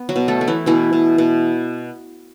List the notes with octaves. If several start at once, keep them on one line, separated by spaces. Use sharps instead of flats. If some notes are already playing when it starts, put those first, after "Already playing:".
Already playing: B3
F#3 F#4
B2
A3 A4
A3
E3 E4
B2 E3 E4
B2
B2